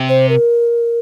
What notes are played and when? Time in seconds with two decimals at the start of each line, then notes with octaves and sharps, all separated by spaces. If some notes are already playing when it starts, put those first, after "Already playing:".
Already playing: C3
0.09 C5
0.29 A#4